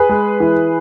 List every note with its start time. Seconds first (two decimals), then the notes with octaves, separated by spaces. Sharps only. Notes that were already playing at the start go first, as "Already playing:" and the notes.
Already playing: G#4 B4
0.09 G#3
0.40 E3